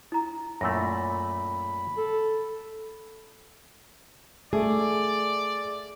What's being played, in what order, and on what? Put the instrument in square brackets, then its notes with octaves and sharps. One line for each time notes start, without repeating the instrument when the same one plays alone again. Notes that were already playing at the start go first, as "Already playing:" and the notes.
[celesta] E4 A#5
[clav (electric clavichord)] F#2 A#2 A3 [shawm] B5 [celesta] E6 A#6
[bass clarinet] A4
[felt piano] A3 [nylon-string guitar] G#4 [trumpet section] D5